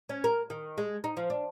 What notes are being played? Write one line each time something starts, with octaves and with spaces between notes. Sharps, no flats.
C#4
A#4
D#3
G#3
D#4
F3
D4